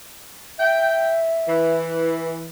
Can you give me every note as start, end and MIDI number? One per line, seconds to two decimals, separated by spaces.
0.59 1.77 76
0.59 1.14 79
1.47 2.50 52